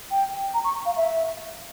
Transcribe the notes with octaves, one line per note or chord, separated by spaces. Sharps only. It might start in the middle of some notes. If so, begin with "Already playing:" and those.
G5
A#5
C#6
F5
E5